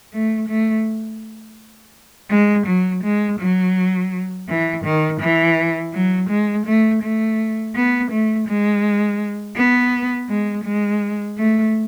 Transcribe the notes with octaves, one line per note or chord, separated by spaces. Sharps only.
A3
A3
G#3
F#3
G#3
F#3
E3
D#3
E3
F#3
G#3
A3
A3
B3
A3
G#3
B3
G#3
G#3
A3